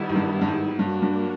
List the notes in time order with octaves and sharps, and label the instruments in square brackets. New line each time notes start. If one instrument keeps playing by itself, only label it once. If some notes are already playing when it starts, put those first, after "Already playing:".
Already playing: [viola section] D#3 G3 B3 E4
[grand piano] G#2
G2
G2
G#2
[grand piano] G2 [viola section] F#3 A#3 D4 F#4 A#4
[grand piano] G2